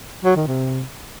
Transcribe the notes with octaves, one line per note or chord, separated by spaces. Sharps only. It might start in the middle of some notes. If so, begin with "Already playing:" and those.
F#3
D#3
C3